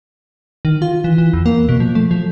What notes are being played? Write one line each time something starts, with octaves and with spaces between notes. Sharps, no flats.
D#3
F4
E3
E3
E2
A#3
B2
F3
A3
F3